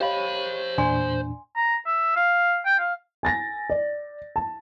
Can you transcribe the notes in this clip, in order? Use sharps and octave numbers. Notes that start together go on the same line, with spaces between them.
G4 C5 C#5 D#5 F5 B5
E2 A#2 D4 D5 G#5 C6
A#5
E5
F5
G5
F5
G#5 A6 A#6
D5
A5